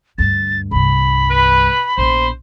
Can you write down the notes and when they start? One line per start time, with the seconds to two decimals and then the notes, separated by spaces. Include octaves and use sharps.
0.18 D2 G2 A6
0.71 C2 G2 B5
1.30 B4
1.98 A#1 B3 C5